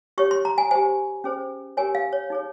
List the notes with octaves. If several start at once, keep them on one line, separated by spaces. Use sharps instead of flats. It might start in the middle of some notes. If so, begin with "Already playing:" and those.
G4 C#5 C#6
C6
A#5
G#5
G4 C5 G#5
C#4 G#4 C5
G4 A#4 C#5 G#5
F5
C#5
D#4 G#4 C#5